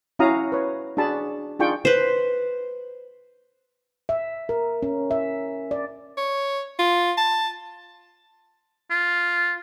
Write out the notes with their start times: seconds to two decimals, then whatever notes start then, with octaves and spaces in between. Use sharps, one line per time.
0.19 C#4 E4 F#4 F5 A#5 D#6
0.52 B4 C#5
0.97 D4 F#4 G#4 A5 B5
1.59 D4 D#4 F4 G#4 G5 C#6
1.85 B4 C5
4.09 E5
4.49 A#4
4.83 C#4
5.11 E5
5.71 D5
6.17 C#5
6.79 F4
7.18 A5
8.90 F4